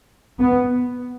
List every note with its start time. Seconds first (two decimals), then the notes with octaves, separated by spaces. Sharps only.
0.40 B3